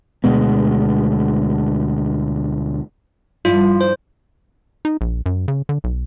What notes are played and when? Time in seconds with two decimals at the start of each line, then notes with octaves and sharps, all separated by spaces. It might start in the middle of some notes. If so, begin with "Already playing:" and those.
0.24 D2 B2 G#3 B3
3.45 G2 F3 E4 F4
3.81 C5
4.85 D#4
5.01 A#1
5.26 F#2
5.48 C#3
5.69 D3
5.84 B1